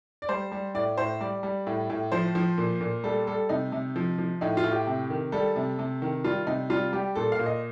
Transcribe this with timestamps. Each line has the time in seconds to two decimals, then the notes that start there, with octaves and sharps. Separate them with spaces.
0.22 D5
0.29 G3 C5
0.52 G3
0.74 A2 D5
0.98 A2 C5
1.21 G3 D5
1.43 G3
1.67 A2
1.90 A2
2.12 F3 C5
2.35 F3
2.58 A#2
2.81 A#2
3.04 G3 A4
3.27 G3 A4
3.49 C3 D#4
3.72 C3
3.96 F3
4.18 F3
4.41 A2 D#4
4.57 F4
4.64 A2
4.72 G4
4.87 C3
5.10 D#3
5.32 G3 A4
5.56 C3
5.79 C3
6.02 D#3
6.24 G3 F4
6.47 C3 D#4
6.70 G3 F4
6.93 G3 G4
7.15 A#2 A4
7.32 F5
7.39 A#2
7.46 D#5